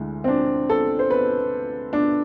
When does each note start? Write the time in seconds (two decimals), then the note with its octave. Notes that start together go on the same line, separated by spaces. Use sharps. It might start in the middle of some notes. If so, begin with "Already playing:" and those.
Already playing: D2 D3 G#3 E4
0.24 C4
0.28 D4
0.70 A4
0.99 C5
1.10 B4
1.93 D4